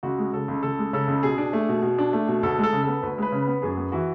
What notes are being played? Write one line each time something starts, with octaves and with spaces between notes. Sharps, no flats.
C#2 F#4
G#3
C#3 A4
C#2
C#2 A4
G#3
C#3 A4
C#2
B2 G#4
D4
A3
B2
B2
D4
A3
B2
D2 A4
G#3 A4
C#3
B3 A4
D2 B4
G#3 B4
C#3
B4
B3
F#2 G#4
B3
E3 F#4